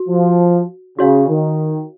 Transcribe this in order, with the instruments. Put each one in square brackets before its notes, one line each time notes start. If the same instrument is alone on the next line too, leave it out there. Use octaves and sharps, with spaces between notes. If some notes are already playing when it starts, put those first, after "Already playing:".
Already playing: [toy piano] F#4
[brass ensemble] F3
[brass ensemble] C#3 [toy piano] F#4 C#5 F5
[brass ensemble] D#3